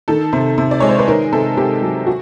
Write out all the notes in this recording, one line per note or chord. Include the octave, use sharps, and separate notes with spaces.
D#3 A4
C3
C3
D5
G#3 C#5
C5
B4
D#3 A#4
C3 A4
C3 G4
F#3
F#4